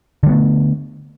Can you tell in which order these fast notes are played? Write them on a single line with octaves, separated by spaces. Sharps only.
D3 G3 B3 A3